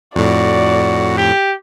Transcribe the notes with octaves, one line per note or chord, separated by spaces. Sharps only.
F2 A2 F#4 D5
G4